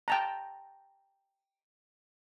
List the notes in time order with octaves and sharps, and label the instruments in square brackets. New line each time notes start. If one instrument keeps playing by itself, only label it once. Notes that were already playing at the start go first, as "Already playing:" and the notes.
[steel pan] G5 A5 A#5